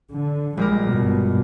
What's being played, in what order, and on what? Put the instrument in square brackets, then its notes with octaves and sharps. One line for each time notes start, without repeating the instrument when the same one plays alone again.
[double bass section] D3
[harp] A#1 G3 A#4 [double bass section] G#3
[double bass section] G1 B2